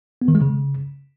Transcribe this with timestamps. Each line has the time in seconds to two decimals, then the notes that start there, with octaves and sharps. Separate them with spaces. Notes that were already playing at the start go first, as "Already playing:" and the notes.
0.22 B3
0.28 D#3
0.35 G#3
0.42 C#3